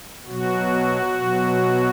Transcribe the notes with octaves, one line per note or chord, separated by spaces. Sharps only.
B2 F#3 F#4
B2 F#3